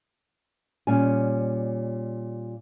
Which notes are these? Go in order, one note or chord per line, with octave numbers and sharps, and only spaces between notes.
A#2 G3 C#4 G#5